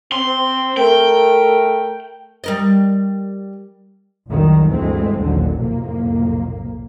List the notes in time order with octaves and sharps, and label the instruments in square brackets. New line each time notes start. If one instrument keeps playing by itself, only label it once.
[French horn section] C4 [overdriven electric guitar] C6
[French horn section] A3 A#4 [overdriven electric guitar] G5
[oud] G3 A#4 D#5
[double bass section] F1 C2 D#3 F#3 G3
D2 G2 E3 G#3 A3 C4
A1 D#2 A#2 D3 F#3
B1 F2 A2 C3 A#3